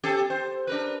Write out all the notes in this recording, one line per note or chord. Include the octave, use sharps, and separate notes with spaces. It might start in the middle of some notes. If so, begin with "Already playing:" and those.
C4 G4 A4
C5
D4 A#4 B4